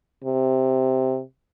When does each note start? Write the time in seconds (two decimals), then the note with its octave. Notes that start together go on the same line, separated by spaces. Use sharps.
0.24 C3